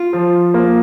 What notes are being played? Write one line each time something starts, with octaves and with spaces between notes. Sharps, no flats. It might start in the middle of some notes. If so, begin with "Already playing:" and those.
Already playing: F4
F3
A#3